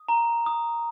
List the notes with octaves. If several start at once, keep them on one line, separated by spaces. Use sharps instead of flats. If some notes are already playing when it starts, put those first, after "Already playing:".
Already playing: D#6
A#5
D#6